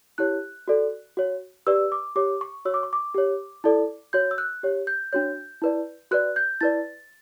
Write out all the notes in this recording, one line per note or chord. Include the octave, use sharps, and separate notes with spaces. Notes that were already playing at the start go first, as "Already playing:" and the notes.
E4 G4 C#5 F#6
F#4 A4 D5
F#4 C#5
G4 B4 D5 E6
D6
G4 C#5 D6
C#6
F#4 C#5 E6
D6
C#6
D6
G4 C#5
E4 A4 D5
F#4 C#5 G6
E6
F#6
G4 C#5
G6
D4 F#4 C#5 G6
E4 B4 D5
F#4 B4 D5 F#6
G6
E4 B4 D5 A6